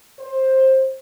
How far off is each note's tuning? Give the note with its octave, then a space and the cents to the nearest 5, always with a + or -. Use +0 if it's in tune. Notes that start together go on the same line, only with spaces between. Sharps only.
C5 +15